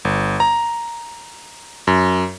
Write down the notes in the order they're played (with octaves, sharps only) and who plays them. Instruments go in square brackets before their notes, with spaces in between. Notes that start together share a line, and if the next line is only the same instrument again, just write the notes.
[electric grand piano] G1
A#5
F#2